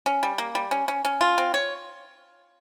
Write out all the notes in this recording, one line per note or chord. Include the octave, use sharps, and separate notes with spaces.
C#4
G3
A#3
G3
C#4
C#4
C#4
F4
C4
C#5